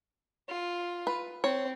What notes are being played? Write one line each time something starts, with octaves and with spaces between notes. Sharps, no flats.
F4
B4
C4 C#5